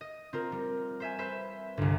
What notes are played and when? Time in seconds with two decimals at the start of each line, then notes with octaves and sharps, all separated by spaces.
0.01 D#5
0.33 C4 F4 A#4
0.52 G3
1.00 C5 E5 G#5
1.19 B4 C5 E5
1.77 G1 C2